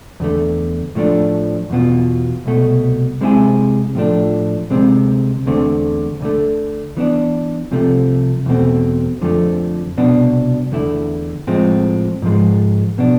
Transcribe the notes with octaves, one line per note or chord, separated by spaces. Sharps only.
E2 D3 A3
A2 F3 A3 D4
E2 B2 B3 F4
C2 B2 A3
C3 G#3 C4 E4 G#4
A2 F3 A3 D4
D2 C3 G#3 C4
E2 D3 A3 C4
D2 D3 A3
E3 B3 D4
C2 C3 F3 A3
E2 B2 A3 C4
F2 D3 F3 A3
C2 B2 B3 D4
E2 D3 A3 E4
A2 F3 G#3 C4
G#2 F3 G#3
B2 B3 D4